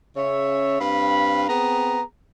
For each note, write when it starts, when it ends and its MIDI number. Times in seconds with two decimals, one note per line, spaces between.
0.16 0.78 49
0.16 0.78 73
0.16 0.78 76
0.81 1.46 43
0.81 1.46 60
0.81 1.46 71
0.81 1.46 77
0.81 1.46 83
1.48 2.02 59
1.48 2.02 60
1.48 2.02 68
1.48 2.02 82